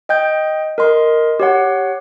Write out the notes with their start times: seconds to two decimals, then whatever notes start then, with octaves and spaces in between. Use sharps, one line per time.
0.09 D#5 G5 G6
0.78 A#4 D#5 C6
1.40 G4 C#5 F#5